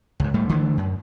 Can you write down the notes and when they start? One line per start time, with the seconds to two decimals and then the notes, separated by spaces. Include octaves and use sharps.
0.20 C#2 G#2
0.34 A2 G3 A3
0.49 D3 E3 A3
0.77 F#2